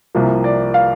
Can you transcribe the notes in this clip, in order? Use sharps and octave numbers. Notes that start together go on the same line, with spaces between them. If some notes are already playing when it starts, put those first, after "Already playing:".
C2 C3 F3 A#3
D5
F5